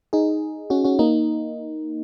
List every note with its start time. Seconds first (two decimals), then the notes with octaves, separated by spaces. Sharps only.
0.13 D#4 G#4
0.70 C#4 F#4
0.84 C#4 F#4
0.99 A#3 D#4